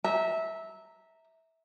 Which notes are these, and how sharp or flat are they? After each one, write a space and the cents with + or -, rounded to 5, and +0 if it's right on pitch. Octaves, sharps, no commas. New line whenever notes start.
E5 -15 A#5 -10